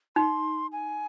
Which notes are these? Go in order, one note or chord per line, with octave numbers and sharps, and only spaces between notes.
D#4 C6
G#5